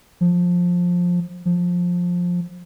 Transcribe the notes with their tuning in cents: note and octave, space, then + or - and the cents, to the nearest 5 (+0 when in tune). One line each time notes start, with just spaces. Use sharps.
F3 +15
F3 +15